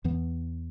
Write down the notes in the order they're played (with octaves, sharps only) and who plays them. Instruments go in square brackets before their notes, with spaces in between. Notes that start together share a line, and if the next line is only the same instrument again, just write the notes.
[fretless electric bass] E2 E3 B3